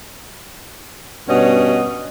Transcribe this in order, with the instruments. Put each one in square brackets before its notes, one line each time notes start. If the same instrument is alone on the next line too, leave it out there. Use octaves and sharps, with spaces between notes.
[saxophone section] G2 B2 C#4 D#5